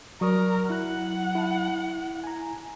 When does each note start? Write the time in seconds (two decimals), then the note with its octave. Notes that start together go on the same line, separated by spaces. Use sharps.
0.21 F#3 A#4 D5 C#6 D#6
0.70 E4 F#5 F#6
1.35 E4 A5
2.24 G#5 A#5